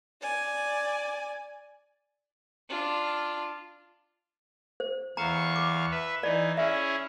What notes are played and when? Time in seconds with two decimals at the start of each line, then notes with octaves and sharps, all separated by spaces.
0.22 D5 G#5
2.69 D4 F4
4.80 C5
5.17 E2 F5 A#5 C#6
5.56 D6
5.91 B4 E5
6.23 E3 D#4 D5
6.57 C#4 E4 G#4 E5